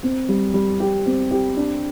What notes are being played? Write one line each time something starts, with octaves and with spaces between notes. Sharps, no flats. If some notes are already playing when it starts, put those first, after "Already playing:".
C4
G3
G3
G4
C4
G4
D4